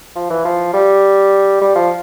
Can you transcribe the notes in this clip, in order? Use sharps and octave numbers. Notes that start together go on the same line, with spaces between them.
F3
E3
F3
G3
G3
F3